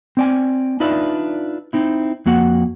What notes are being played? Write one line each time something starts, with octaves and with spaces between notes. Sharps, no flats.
C4 D5 G#5
D4 D#4 F4 B4 D5 E5
C4 D#4 E4
F2 A#3 F#4 F#5